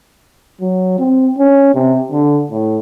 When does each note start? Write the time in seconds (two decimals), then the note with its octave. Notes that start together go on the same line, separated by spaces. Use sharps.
0.61 F#3
0.99 C4
1.38 C#4
1.74 C3
2.12 D3
2.51 A2